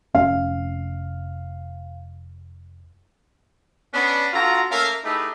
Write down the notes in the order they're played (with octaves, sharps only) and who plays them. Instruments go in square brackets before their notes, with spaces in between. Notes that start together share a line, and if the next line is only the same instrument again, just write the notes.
[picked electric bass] F1 C#4 [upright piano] F5
[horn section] B3 C#4 D4
D3 F4 F#4 A#5
A3 A#3 C#4 A#4 E5 F5
A3 D#4 E4 G4 G#4 B4